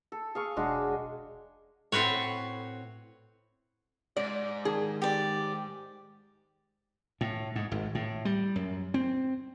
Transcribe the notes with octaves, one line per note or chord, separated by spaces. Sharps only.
A4
G#4 F5 C#6
E1 F#3 G#3 D4
A2 C4 F#4 B4 C#5
G#2 D5
D#3 G#4
G4 D5
A2
G#2
G#1
A2
G3
F#2
C4